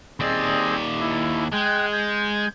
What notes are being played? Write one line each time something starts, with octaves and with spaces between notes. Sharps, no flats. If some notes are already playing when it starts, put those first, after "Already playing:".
D#2 C4 G#4 D5 D#5
E4
G#3 G5 F#6 G#6
G6 G#6